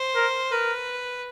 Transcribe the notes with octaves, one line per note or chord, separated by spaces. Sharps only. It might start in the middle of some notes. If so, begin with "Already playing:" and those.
Already playing: C5
A#4
A#4 B4